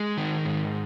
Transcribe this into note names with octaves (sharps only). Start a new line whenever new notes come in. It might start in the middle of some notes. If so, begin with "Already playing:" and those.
Already playing: G#3
D#3
G#2